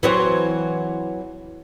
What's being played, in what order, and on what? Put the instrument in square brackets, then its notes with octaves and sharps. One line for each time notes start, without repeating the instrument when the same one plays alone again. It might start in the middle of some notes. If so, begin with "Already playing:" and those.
[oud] E3 F#3 C4